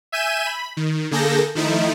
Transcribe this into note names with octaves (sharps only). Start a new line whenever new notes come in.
E5 G#5 G6 D#7 E7
B5
D#3
D3 A#3 G#4 A4 G6 A#6
D#3 F3 A3 D#4 E4